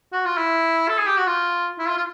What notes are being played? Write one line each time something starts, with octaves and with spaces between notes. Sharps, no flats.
F#4
F4
E4
A4
G#4
G4
F#4
F4
E4
F4
F4